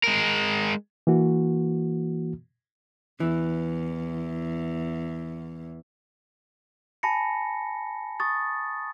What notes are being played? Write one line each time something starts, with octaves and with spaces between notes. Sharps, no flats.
G#3 A#4
E3 A#3 F#4
E2 E3
G#5 A5 B5 A#6 C#7
C#6 D#6 A6